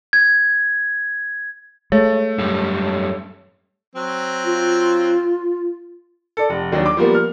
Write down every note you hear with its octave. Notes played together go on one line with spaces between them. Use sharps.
G#6
G#3 A3 C#5
F#2 G3
F#3 C4
F4
A4 D5
F1
D#2 F#3 D4
D6
F3 G3 A#3 B3
F6